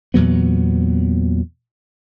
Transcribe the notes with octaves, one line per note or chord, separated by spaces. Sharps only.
E2 A#2 F#3 B3